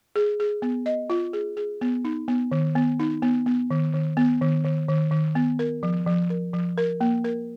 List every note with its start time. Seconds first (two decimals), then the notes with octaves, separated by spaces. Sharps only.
0.16 G#4
0.40 G#4
0.62 B3
0.86 D#5
1.10 F4
1.33 G#4
1.57 G#4
1.81 B3
2.05 D#4
2.28 B3
2.52 D#3
2.75 B3
3.00 D#4
3.22 B3
3.46 B3
3.71 D#3
3.94 D#3
4.17 B3
4.41 D#3
4.64 D#3
4.88 D#3
5.11 D#3
5.35 B3
5.59 A#4
5.83 F3
6.06 F3
6.30 A#4
6.53 F3
6.78 A#4
7.01 A#3
7.24 A#4